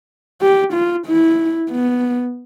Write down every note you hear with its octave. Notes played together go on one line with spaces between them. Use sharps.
G4
F4
E4
B3